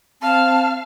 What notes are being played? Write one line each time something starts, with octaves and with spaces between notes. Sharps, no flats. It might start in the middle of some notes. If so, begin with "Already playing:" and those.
C4 F5 A5